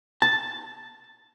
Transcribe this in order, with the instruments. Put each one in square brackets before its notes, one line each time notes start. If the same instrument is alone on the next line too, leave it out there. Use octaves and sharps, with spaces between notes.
[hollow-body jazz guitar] A5